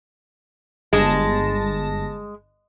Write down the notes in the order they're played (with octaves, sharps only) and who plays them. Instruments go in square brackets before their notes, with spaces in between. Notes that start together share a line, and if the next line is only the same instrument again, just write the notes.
[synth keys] G1 A5 A#6 [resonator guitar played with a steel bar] G#3